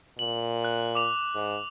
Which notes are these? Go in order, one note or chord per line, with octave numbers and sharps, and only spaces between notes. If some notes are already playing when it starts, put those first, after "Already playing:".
A#2 F#7
F#6
D6 F7
G#2